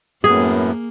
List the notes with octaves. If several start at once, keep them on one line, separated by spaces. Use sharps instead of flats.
F#2 A2 A#3 B3 G#4